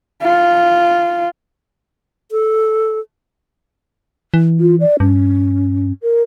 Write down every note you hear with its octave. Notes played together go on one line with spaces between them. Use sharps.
F4
A4
E3
F4
D5
G2 C#4
A#4